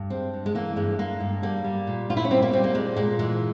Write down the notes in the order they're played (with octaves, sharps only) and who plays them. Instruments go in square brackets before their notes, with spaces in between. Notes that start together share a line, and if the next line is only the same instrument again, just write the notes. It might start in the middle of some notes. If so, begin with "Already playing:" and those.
Already playing: [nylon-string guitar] G2
G#3 C4
G2
G#3
E3 A#3
G2 G#3
G#3 A#3
G2
G3 A#3
G3
A#2
A#2 F4
E4
C#4
G3 C4
A#3
G3 C4
A#3
A#2 G#3
A#2 G#3
E3 G#3